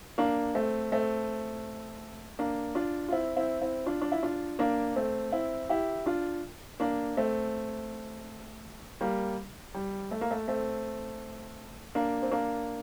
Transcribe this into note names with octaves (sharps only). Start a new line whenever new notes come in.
A#3 D4
A3 C4
A3 C4
A#3 D4
D4 F4
F4
C4 E4
C4 E4
C4 E4
D4 F4
D4
E4
D4 F4
A#3 D4
A3 C4
C4 E4
E4 G4
D4 F4
A#3 D4
A3 C4
G3 A#3
G3
A3
A#3
A3
A3 C4
A#3 D4
C4
A#3 D4